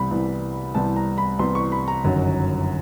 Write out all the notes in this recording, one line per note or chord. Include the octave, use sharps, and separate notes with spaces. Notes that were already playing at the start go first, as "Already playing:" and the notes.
Already playing: C2 C3 E3 G3 B3 B5
C2 C3 E3 G3 B3
C2 C3 E3 G3 B3 A5
A#5
B5
C2 C3 E3 G3 B3 C6
C#6
B5
A#5
G1 F#2 D#3 F#3